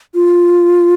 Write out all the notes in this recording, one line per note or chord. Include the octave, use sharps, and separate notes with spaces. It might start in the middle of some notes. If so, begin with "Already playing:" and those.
F4